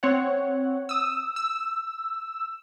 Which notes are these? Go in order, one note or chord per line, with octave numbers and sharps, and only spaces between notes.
C4 C#5 F#5
D#6 E6
E6